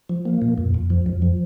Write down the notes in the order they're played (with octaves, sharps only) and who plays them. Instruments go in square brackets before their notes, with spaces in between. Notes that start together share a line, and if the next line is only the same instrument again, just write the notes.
[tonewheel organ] F3
A#3
A#2
F2
F2
F3
F2
F3